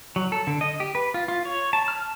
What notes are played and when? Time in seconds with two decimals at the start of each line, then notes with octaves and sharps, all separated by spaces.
0.16 F#3
0.32 A4
0.47 D3
0.61 D#5
0.80 G4
0.95 B4
1.14 F4
1.28 F4
1.45 C#5
1.73 A5
1.88 F6
2.02 A5